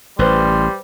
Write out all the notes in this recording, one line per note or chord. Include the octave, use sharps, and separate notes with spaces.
A1 G3 G4 B4 C5 C6